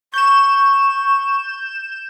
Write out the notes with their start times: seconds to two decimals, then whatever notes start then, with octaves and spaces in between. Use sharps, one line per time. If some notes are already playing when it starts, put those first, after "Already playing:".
0.14 C#6 G6 E7